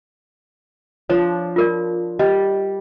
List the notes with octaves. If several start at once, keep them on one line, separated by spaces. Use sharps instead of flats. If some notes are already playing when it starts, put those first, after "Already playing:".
F3 D4 C#5
F4 A#4 D5
G3 D#5